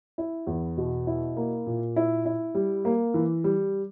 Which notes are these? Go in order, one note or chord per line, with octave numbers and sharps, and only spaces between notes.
E4
E2
B2
E4
A#3
A#2
E4
E4
G3
A#3
E3
G3